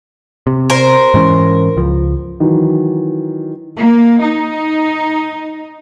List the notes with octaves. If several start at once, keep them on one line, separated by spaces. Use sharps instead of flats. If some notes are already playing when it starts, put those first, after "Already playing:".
C3
A#4 C5
G#2 E3 C#4
C#2 F3
D#3 E3 F#3
A#3
D#4